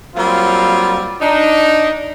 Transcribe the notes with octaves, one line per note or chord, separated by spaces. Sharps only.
F#3 G3 A#3 C4 F4
D4 D#4